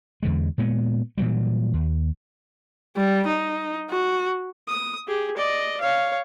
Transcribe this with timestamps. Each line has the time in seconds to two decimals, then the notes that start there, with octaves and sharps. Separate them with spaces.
0.23 E2 D3 G#3
0.58 A#2 G#3 B3
1.18 A#2 E3 F#3 G3
1.74 D#2
2.96 G3
3.26 D#4
3.90 F#4
4.68 D#6
5.07 G4 G#4
5.37 D5 D#5
5.80 C#5 F5